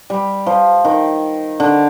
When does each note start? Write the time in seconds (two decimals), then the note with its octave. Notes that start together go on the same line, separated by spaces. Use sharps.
0.10 G3
0.46 F3
0.85 D#3
1.60 D3